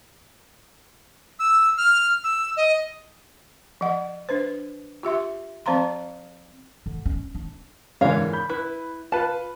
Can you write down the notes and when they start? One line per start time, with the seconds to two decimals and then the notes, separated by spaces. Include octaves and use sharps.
1.39 E6
1.77 F6
2.24 E6
2.57 D#5
3.81 F3 D#5 F#5
4.29 D4 B4 C5
5.03 F4 G4 E5 C6
5.66 F3 C4 C5 F5 A#5 C6
6.86 D3
7.06 C#4
7.35 D4
8.01 G#2 D3 E3 A#4 C#5 F5
8.33 B5 G6
8.49 E4 B4
9.12 F4 B4 A5